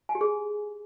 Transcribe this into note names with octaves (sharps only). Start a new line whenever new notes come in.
G#5
G4
G#4